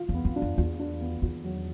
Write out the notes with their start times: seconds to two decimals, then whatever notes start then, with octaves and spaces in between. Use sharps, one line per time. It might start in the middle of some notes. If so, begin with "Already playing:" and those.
Already playing: F4
0.09 E2
0.14 B3
0.25 F2
0.36 D4
0.42 F2
0.58 E2 F4
0.80 D4
1.01 B3
1.22 E2 F4
1.44 F#3